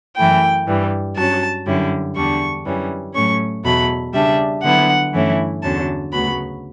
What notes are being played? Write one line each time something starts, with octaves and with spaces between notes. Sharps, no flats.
F#2 E3 A3 E4 G5
G2 E3 G3
G2 F#3 C#4 A5
F#2 D3 G3 C#4 E4
E2 D3 G3 D4 C#6
F#2 E3 G3 C#4
A2 F#3 A3 C#4 C#6
E2 B2 F#3 A3 B5
C#3 G3 D4 E5
D3 F#3 B3 E4 F#5
G2 E3 A3 C#4 E4
E2 D3 F#3 C#4 A5
D2 C#3 F#3 B3 B5